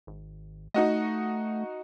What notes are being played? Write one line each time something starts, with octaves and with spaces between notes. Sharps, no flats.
G#1
A3 D#4 F#4 D#5